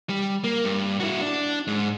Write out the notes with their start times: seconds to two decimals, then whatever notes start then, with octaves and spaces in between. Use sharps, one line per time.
0.09 G3
0.44 A#3
0.65 G2
1.00 E4 F#4
1.21 D4
1.67 G#2